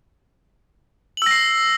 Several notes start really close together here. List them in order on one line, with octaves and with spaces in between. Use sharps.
F#7 E6 A#6 C7